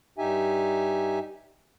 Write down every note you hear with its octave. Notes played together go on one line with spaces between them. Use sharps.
G2 D#4 G4 E5 G#5